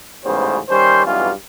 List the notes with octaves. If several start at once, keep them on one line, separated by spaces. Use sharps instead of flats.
A1 G#2 C#3 G3 B3 C5
D#3 G3 C#4 C5
B1 G2 B2 E3 C#4 F4